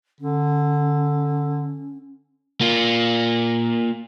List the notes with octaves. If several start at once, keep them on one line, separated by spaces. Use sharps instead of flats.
D3 C#4
A#3 F4